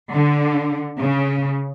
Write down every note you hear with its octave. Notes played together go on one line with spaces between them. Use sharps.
D3
C#3